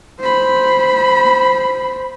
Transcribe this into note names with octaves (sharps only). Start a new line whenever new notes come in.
C5 B5